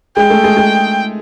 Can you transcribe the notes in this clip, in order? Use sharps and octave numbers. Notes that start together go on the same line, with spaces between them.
G#3 G#4 G5
A3 A4
G#3 G#4
G#3 G#4